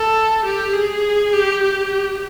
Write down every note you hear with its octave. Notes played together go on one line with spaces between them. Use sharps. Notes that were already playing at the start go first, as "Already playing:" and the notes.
Already playing: A4
G4
G#4
G4
G4